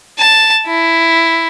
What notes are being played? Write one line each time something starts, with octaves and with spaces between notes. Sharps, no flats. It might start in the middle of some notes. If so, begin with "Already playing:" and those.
A5
E4